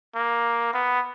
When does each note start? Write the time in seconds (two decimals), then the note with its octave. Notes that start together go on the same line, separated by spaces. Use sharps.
0.15 A#3
0.74 B3